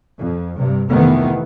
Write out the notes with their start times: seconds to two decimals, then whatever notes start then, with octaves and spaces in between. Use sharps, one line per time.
0.19 F2
0.58 G2 C3
0.92 F2 C3 D#3 E3 A3 B3